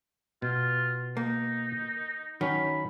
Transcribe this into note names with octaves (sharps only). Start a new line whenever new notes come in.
B2 F4
A#3 D#4
D#3 F#3 C#4 B5